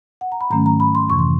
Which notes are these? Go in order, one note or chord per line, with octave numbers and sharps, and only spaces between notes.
F#5
A#5
B5
G#2 D#3 F#3 A3 C#4 A#5
A#5
B5
C6
F2 C3 E3 C#6
C6